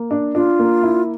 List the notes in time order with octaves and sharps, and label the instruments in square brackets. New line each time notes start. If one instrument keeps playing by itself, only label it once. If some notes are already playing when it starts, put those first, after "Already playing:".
Already playing: [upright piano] A#3
D4
[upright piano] D4 [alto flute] F4
[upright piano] A#3
E4